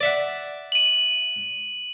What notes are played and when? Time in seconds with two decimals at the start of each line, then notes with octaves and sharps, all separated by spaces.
0.01 D5 E5 F#5
0.72 D#7 F#7